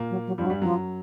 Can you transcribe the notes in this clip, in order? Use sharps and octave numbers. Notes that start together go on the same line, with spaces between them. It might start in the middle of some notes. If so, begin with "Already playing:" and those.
Already playing: A#2 A#3
F#3
F#3
G2 F3 G3
F#3
G2 G3
F#2 F3 F#3